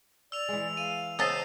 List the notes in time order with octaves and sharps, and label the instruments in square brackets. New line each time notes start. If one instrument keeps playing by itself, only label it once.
[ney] D5 [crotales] E6 F7
[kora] E3 G#3
[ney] F5 [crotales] D#7
[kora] C#3 B3 [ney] C5 [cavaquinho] D#5 A5 [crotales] E6 C7 D#7